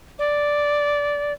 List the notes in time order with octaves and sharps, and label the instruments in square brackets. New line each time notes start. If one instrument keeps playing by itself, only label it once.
[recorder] D5